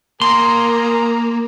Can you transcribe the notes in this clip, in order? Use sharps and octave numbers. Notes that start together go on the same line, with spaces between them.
A#3 G#4 A#4 A#5 C6